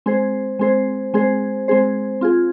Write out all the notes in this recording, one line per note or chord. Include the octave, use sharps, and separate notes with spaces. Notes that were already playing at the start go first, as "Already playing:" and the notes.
G#3 C4 G#4 C5
G#3 C4 G#4 C5
G#3 C4 G#4 C5
G#3 C4 G#4 C5
C4 F4 G#4